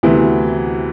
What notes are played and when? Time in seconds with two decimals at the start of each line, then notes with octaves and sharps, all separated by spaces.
0.03 D2 C3 E3 B3 E4